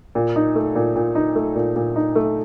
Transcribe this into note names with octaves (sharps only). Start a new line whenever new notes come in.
A#2
D#4
A3
A#2
A#2
D#4
A3
A#2
A#2
D#4
A3